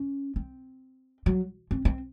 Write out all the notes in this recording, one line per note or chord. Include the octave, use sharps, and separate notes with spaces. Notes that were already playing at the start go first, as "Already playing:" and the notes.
Already playing: C#4
C4
F#3
C4
C4